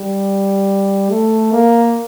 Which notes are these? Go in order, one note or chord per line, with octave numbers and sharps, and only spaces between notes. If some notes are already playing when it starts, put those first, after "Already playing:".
Already playing: G3
A3
A#3